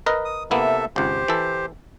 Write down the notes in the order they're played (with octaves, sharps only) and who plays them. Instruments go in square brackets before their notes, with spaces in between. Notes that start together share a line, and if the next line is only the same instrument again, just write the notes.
[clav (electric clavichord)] A#4 B4 D#5
[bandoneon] D#6
[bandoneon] C3 A4 E5 [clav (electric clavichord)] A#3 B3 E4
[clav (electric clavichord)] G#1 C#2 [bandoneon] G4 C5
[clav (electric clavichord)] E3 A4